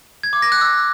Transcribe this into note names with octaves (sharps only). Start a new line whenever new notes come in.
G#6
D6
A#6
F#6
E6